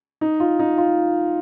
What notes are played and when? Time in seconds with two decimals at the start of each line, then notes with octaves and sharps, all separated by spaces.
0.21 D#4
0.40 F4
0.59 D#4
0.78 F4